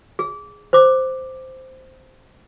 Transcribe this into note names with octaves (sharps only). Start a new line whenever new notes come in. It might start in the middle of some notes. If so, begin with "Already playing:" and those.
G#4
C5 D6